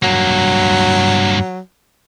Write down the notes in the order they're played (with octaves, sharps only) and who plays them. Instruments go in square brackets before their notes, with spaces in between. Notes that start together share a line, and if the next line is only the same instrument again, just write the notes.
[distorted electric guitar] G2 A#3 [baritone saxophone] F#3